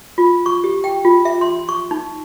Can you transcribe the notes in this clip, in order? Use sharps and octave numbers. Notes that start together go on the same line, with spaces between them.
F4
C#6
G4
G5
F4
E5
C6
C#6
D#4